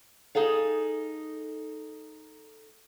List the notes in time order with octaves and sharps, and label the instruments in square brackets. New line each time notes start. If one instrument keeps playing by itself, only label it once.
[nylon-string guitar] D#4 G#4 A4 F5